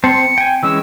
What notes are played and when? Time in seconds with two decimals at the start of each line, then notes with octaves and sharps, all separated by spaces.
0.04 C4 C5 A5 C#7
0.38 G5 G#5
0.63 E3 G#3 C#4 E6